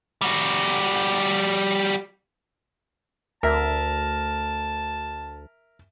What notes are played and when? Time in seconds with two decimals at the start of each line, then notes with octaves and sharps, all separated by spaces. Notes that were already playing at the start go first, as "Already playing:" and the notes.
0.21 G3 F#4
3.43 D2 A#4 E5 A5